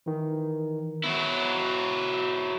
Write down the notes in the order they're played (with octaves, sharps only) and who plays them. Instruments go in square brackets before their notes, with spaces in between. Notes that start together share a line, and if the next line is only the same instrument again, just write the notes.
[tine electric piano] D#3 E3
[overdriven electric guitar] F#3 E4 [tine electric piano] B3